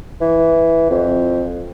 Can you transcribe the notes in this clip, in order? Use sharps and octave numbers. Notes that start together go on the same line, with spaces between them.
E3
F2